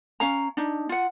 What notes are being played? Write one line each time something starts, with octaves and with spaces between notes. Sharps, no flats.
C#4 F5 A#5
D4 D#4
F4 F#5